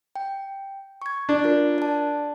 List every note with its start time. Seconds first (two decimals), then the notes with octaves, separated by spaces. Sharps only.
0.16 G5
1.02 C#6 G#6
1.29 D4
1.44 F4 A#4
1.78 D5 A5